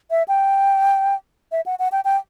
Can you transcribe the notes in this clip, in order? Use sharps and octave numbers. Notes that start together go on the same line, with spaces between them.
E5
G5
E5
F#5
F#5
G5
G5